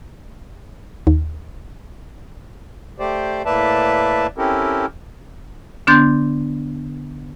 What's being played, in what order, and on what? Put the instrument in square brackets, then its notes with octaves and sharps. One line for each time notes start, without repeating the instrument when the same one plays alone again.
[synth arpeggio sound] D#2
[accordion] A3 G4 C5 D5
A2 A#3 B4 D5 E5 A5
C4 C#4 E4 G4 A4 A#4
[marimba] D3 B3 D4 C6 G6 A6